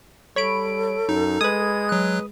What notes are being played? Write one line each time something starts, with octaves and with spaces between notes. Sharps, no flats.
G3 A4 C#5 B5 D7
F#2 D#4
G#3 B4 D#6 G#6
F#3 F#6